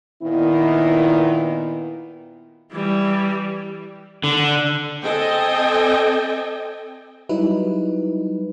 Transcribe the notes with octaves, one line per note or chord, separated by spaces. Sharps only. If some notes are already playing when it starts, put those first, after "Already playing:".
A#2 D#3 B3 E4
E3 G3
D3
C4 A4 D#5 G5 G#5
F#3 G3 D#4 E4 B4